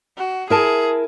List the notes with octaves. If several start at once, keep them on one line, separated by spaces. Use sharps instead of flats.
F#4
E4 G#4 A#4 A5